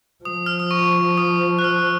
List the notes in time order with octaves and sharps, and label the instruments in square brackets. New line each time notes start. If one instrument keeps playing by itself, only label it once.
[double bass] F3 [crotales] D#6
[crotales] F6
D#6
C#6
D#6
F#6
F6